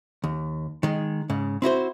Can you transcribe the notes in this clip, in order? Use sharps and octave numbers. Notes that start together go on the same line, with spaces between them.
D#2
D#3 G#3
G#2 C#3
C4 E4 F#4 C5